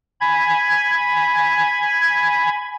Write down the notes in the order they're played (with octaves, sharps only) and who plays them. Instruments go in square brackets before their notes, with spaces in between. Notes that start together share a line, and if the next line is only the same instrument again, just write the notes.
[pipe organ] G#5 B5 G#6